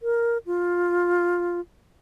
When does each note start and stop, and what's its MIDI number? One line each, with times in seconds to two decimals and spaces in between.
0.01 0.38 70
0.46 1.60 65